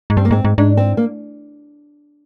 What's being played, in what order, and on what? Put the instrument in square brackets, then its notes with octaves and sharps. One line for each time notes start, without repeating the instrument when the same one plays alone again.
[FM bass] G#2
[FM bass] G2 [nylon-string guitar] C4
[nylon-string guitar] A#3
[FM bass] G#2 [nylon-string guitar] C4
[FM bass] G#2
[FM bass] G#2 [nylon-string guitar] D4
[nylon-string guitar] C4
A#3